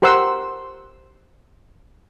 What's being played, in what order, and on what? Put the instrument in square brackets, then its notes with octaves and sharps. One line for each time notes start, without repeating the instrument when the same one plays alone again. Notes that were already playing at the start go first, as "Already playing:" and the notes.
[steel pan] G4 A#4 C5 F#5 C6 E6